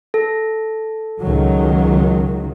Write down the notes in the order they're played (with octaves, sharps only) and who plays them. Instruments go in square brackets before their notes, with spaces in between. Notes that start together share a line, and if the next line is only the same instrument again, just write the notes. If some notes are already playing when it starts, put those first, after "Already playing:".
[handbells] A4
[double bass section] C#2 D#3 F#3